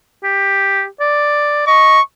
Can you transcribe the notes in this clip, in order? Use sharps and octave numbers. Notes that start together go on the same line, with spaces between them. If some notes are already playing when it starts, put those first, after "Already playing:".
G4
D5
D#5 C#6